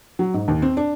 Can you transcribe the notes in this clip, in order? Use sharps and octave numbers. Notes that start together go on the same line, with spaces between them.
F#3
G#2
D#2
C4
D4